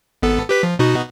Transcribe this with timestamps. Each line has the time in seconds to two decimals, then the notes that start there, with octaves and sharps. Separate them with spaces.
0.22 G#1 B3 A4
0.49 G4 B4 B6
0.63 F3
0.79 B2 D#4 F#4